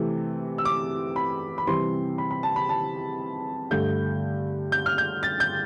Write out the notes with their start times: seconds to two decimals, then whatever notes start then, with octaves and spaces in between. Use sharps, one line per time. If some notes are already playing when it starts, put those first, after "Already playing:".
Already playing: C3 E3 A3 C4
0.58 E6
0.65 D6
1.16 B5
1.58 B5
1.67 C3 E3 G3 C4 C6
2.18 B5
2.31 B5
2.43 A5
2.56 B5
2.69 A5
3.71 G2 D3 A3 G6
4.72 G6
4.86 F6
4.98 G6
5.23 A6
5.40 G6